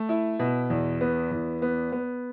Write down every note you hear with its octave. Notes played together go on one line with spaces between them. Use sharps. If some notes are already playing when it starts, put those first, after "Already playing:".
Already playing: A3
E4
B2
E2
B3
E2
B3
B3